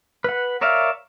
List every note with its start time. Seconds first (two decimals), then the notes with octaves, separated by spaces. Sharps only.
0.24 B4 F#5
0.61 A#4 C#5 D5 E5 F5